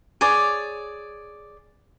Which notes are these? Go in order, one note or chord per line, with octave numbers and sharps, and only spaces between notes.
G#4 C#5 D5